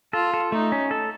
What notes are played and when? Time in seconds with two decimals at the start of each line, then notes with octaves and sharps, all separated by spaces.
0.13 F4 A4
0.34 A4
0.52 A3 D#4
0.72 C#4
0.91 A4